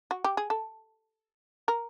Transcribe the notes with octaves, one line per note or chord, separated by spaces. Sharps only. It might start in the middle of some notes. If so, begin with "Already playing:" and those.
F#4
G4
G#4
A4
A#4